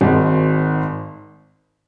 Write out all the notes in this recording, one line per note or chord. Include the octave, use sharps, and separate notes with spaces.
G#1 G#2 D#3